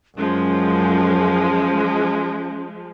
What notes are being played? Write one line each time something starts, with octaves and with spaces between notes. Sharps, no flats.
F#2 F3 G#3 C#4